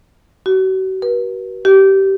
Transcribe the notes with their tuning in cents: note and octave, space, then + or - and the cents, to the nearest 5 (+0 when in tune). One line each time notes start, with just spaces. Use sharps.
F#4 +40
B4 -45
G4 -20